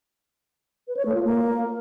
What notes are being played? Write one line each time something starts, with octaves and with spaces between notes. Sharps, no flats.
B4
C#5
A3
F4
A#3